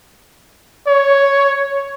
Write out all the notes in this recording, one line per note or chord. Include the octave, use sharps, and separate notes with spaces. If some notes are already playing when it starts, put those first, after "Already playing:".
C#5